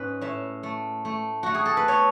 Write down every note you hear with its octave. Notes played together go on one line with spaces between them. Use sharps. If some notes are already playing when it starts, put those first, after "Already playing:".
Already playing: G#2 C#4 B4
A2 E5
A3
A3
A3 F#4
G#4
A4
B4
B3 C#5